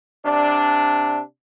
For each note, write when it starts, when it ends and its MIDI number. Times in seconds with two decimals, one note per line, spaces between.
0.24 1.19 48
0.24 1.19 62